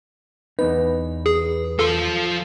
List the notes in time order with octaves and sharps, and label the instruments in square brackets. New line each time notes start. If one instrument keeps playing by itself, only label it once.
[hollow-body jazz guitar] E2 B3 D#4 [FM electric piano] B4
[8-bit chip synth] G#4
[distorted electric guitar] F3 C6 [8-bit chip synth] A4